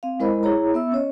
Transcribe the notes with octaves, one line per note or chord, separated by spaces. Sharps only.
C4 F5
G#3 E4 A#4 C5 D#5 B5
E4 G#4 C#5 A#5
B3 E5 E6
C#4 C#5 D#5